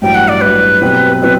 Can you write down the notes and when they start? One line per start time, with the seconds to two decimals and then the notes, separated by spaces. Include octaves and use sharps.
0.02 A1 G2 F#3 G5
0.15 F#5
0.28 D5
0.41 A1 G2 F#3 B4
0.82 B2 F#3 C4 G4
1.21 B2 F#3 C4 G4 B4